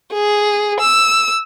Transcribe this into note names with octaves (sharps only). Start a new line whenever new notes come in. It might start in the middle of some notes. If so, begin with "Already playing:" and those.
G#4
E6